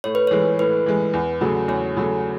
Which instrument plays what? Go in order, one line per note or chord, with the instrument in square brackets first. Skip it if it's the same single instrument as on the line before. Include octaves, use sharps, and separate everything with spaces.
[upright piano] A2 [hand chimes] C#5
[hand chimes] B4
[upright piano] E3 G#3 [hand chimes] C#5
[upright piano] A2 [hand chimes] B4
[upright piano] E3 G#3
E2
C#3 F#3 A3
[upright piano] E2 [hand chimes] C#5
[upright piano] C#3 F#3 A3